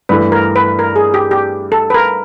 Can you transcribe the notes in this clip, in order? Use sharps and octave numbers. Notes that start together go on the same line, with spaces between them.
G2 E3 A3 B4
A#4
B4
A#4
G#4
G4
G4
A4
B4
A#4